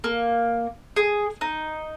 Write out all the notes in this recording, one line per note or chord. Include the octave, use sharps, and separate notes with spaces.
A#3
G#4
D#4